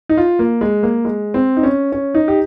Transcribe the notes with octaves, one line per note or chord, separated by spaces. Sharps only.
D#4
F4
A#3
G#3
A#3
G#3
C4
D#4
C#4
C#4
D#4
G4